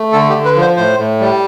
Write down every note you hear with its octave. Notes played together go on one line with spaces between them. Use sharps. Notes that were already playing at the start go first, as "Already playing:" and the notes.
Already playing: A3
D3 A4
G4
D3
B4
F3
C5
A2 C5
A2
G3